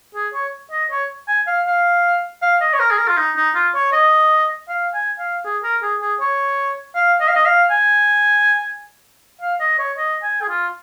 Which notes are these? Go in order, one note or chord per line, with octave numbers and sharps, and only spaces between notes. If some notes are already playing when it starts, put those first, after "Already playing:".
G#4
C#5
D#5
C#5
G#5
F5
F5
F5
D#5
C#5
A#4
G#4
A#4
F4
D#4
D#4
F4
C#5
D#5
F5
G#5
F5
G#4
A#4
G#4
G#4
C#5
F5
D#5
F5
D#5
F5
G#5
F5
D#5
C#5
D#5
G#5
G#4
F4